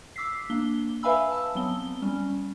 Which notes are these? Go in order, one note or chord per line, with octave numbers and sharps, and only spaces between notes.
D6 E6 B6 C7
A#3 D4 G7
B4 E5 F5 G#5 B5 E6
A5 E6
F#3 B3 C4 G7
G3 C#4